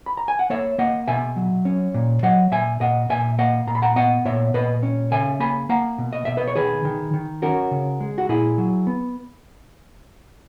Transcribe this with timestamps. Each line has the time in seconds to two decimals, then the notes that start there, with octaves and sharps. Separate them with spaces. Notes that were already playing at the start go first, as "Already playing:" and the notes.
0.06 B5
0.17 A#5
0.28 G#5
0.39 F#5
0.50 A#3 C#5 E5
0.78 A#3 D#5 F#5
1.08 B2 E5 G#5
1.36 F#3
1.65 C#4
1.94 A#2
2.23 F#3 D#5 F#5
2.52 A#2 E5 G#5
2.81 A#2 D#5 F#5
3.09 A#2 E5 G#5
3.39 A#3 D#5 F#5
3.67 A#2 A#5
3.75 B5
3.82 F#5 A#5
3.96 B3 D#5 F#5
4.25 A#2 C#5 E5
4.54 A#2 B4 D#5
4.83 C#4
5.12 C#3 E5 G#5
5.40 A#3 G#5 B5
5.69 A#3 F#5 A#5
5.98 B2
6.13 D#5
6.25 B2 E5
6.37 B4 D#5
6.47 C#5
6.56 D#3 G#4 B4
6.85 D#3
7.14 D#3
7.42 C#4 F#4 A#4
7.71 C#3
8.00 G#3
8.18 F#4
8.29 A#2 E4 G#4
8.58 F#3
8.87 B3